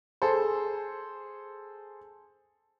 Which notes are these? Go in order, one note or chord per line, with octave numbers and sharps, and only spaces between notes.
G#4 A4 C5